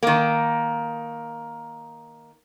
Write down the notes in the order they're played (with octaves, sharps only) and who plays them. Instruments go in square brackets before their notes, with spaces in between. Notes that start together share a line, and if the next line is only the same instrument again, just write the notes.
[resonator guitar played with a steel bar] D#3 A#3